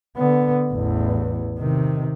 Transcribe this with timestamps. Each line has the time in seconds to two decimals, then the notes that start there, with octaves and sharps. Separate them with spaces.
0.16 D3 B3
0.71 A1 E2
1.58 C3 D#3